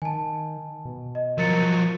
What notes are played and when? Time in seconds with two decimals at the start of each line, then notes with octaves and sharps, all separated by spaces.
0.02 D#3 G#5 A5
0.85 B2
1.15 D#5
1.38 F3 F#3 A#4 A6 C#7